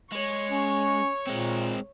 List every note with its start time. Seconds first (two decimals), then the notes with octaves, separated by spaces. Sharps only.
0.12 G#3 C#5 C#6
0.50 C#4
1.27 A#2 G#3 C4